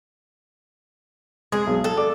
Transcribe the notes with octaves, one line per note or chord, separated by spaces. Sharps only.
G#3 G#4
B1
A4
D5 D6